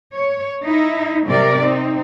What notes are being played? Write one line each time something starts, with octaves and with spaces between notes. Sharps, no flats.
C#5
D#4 E4
C3 G3 A#4 D5
C4 D#4